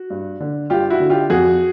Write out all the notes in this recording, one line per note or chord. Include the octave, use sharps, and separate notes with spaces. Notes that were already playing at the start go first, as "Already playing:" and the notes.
Already playing: F#4
G2
D3
G2 F4 G4
E4 F#4
D3
F4 G4
F2 F#4 G#4